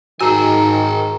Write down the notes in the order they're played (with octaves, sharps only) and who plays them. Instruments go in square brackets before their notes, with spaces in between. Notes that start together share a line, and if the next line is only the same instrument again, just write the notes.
[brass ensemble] G#2 D#3 [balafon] F#4 [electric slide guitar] G#4 A#4 G#5 [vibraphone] A#5